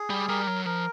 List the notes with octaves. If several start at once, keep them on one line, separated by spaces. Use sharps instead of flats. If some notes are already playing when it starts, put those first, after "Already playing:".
Already playing: G#4
G3
G3 A#4
F#3
F3 A#4